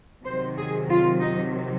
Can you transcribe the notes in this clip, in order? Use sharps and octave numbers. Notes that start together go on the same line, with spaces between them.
C3 D#3 F#3 C5
G#4
F4
D#4